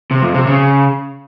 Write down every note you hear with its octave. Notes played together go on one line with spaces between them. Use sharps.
C3
F2
C3
C#3